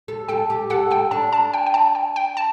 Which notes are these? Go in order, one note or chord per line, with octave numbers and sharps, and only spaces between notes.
A4
A4 G5
G4
A4 F#5
A4 G5
D4 A5
A5
G5
G5
A5
G5
G5
A5